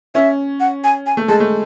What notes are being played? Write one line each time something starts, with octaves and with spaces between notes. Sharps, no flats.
C#4 E5
F#5
G#5
G#5
A3
G#3 A5
A3